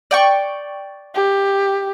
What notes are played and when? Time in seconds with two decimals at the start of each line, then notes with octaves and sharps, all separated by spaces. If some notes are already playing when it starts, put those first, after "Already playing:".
0.11 D5 G5 C#6
1.15 G4